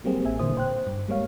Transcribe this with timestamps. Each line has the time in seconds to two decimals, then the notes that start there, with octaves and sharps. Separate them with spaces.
0.04 F#3 G3 A#3 C4 G#4
0.25 A1 E5 G#5
0.39 A#2 D3 E3 A#3 C5 D#6
0.57 C5 G5 F#6
0.87 G2
1.08 G3 G#3 A#3 C#5 F5